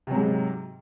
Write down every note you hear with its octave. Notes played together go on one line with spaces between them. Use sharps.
G#2 C3 F#3